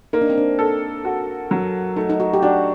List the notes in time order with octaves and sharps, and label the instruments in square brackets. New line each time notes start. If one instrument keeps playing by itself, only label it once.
[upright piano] A#3 [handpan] D#4
[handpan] D4
C4
D4
[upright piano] A4
F#4
F#3
[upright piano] A3 [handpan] D#4
[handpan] D#4
F#4
G4
[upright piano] D4 [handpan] F#4